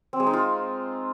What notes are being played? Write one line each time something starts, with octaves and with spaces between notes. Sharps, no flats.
C4
G#3
D#4
F4